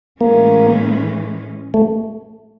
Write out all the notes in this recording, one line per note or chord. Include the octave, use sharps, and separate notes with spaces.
A2 E3 G#3 A#3 C#4
A3